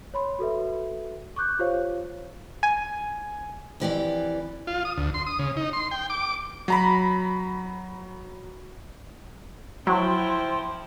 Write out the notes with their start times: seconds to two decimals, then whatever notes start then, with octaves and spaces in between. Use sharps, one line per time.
0.14 C#5 B5 C6
0.39 F#4 A4 B4 E5
1.36 C#6 D6 F#6 G6
1.59 F4 G4 C5 C#5 F5
2.63 G#5
3.80 F2 E3 G4 D5
4.67 F4
4.85 D#6
4.97 D2
5.14 C6
5.27 D#6
5.39 C#3
5.57 D#4
5.73 C6
5.91 G5
6.10 D6
6.68 F#3 A#5 B5
9.87 F3 F#3 E4 C5 G5 C6